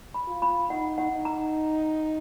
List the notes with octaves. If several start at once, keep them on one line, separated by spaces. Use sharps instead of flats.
B5
F4
B5
D#4 F#5
F#5
D#4
A#5